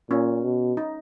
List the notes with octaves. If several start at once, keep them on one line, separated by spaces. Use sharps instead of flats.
A#2 C#4
B2
D#4